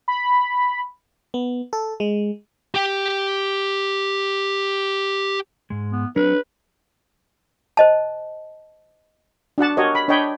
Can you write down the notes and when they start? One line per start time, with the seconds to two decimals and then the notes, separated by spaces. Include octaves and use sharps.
0.08 B5
1.34 B3
1.73 A4
2.00 G#3
2.75 G4 G5
5.70 G#2 G#3
5.92 B3
6.16 F#3 C4 D4 B4
7.77 C5 D#5 A5
9.58 D4 F#4 F#5 A5
9.77 F#4 G4 A#4 C#5 D#5
9.95 B5
10.08 D4 C#5 D#5 G5 B5